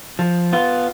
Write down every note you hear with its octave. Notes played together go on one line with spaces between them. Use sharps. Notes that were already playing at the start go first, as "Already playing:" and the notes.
F3
B3 F4